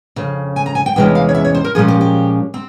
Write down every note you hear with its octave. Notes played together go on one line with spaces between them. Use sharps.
F2 C#3
G#5
A#5
G#5
G5
E2 C3 E3 G#3 C#4 G5
F5
C#5
E5
C#5
C5
A#4
A#2 F3 G#3 C#4 G#4
G4
G4
C4